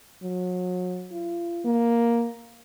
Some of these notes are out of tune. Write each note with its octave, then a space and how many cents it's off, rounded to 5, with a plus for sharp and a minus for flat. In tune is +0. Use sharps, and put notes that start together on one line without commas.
F#3 -35
F4 -35
A#3 +5